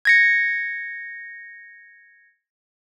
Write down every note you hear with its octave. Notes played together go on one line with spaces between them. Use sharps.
G#6 A#6 C#7